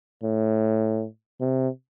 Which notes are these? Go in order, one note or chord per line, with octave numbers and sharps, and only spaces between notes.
A2
C3